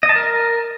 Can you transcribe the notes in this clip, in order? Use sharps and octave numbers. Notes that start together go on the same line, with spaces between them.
D#5
A5
A#4